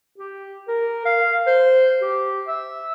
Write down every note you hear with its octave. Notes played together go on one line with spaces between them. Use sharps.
G4
A#4
F5
C5
G4
E5